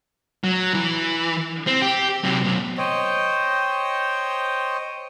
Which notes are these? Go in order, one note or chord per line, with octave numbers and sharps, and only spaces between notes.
F#3
E3
C4
G4
C3 F#3
F#2 B2
C5 C#5 D#5 G5